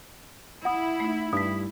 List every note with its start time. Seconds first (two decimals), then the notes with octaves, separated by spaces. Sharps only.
0.65 E4 F#5 D#6
1.00 A3 D#4
1.33 G2 D#6 B6